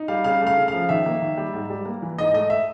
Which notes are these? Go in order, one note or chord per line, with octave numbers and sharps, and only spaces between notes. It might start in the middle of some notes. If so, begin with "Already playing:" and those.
Already playing: D#4
G3 F5
C#3 F5
A3
F5
C#3
F3 F5
D#3 E5
A#3
D#3
G3
G#2
G3
A#3
E3
G#2 D#5
A3 D#5
E5